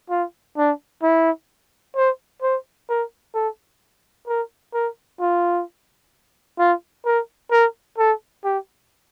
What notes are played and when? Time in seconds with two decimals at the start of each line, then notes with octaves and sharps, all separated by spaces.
0.10 F4
0.57 D4
1.03 E4
1.96 C5
2.42 C5
2.89 A#4
3.34 A4
4.27 A#4
4.74 A#4
5.20 F4
6.59 F4
7.05 A#4
7.51 A#4
7.98 A4
8.44 G4